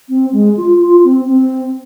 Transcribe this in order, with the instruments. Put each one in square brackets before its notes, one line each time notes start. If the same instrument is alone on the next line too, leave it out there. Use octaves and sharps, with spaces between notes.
[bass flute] C4
G#3
F4
F4
C4
C4